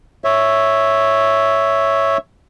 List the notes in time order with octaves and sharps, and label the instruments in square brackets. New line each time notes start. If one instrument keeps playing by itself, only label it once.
[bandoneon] C#5 E5